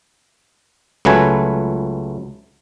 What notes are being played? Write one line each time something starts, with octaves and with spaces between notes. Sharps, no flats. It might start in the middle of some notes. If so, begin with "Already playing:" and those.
C#2 F#3 A3 B4 G#5